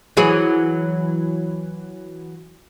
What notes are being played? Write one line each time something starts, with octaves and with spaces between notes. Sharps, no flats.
E3 F#3 G#4